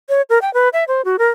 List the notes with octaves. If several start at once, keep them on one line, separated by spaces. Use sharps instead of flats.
C#5
A#4
G5
B4
E5
C5
F#4
A#4